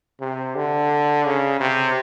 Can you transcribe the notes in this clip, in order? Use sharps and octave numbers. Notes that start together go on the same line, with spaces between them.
C3
D3
C#3
C3